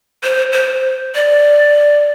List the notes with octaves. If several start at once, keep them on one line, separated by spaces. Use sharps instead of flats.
C5
C5
D5